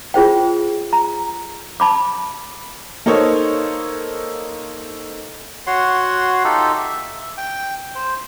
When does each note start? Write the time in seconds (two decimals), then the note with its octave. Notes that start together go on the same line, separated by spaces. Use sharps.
0.14 F4 G#4 C5 G5
0.93 A#5
1.80 A5 B5 D6
3.06 A#3 D#4 A4 C5 C#5
5.67 F#4 C#5 F#5 C6
6.44 D#4 F4 G4 A4
6.77 E5
7.37 G5
7.95 C5